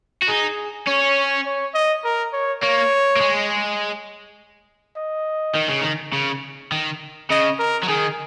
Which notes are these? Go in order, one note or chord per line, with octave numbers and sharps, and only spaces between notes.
F#4
D#4 G#4
C#4 C#5
C#5
D#5
A#4
C#5
A#3 C#5
A#3
G#3
D#5
D#3
C#3
D#3
C#3
D#3
C#3 D#5
A#4
F#3
D#3 G#4